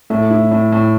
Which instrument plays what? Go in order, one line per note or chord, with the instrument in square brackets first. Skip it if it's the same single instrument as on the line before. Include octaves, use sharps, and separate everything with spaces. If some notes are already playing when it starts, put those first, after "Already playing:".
[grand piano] A2 [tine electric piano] A3
[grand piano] E4
A2
A2